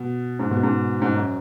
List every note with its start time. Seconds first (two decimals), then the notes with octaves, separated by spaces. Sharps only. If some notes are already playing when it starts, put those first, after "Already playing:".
Already playing: B2
0.39 G#2
0.51 B2
0.63 G#2
1.02 G#2
1.14 F#2